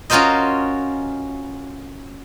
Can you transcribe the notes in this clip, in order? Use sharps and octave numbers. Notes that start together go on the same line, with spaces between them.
C#4 F4 F#4 A#4 C5 D#5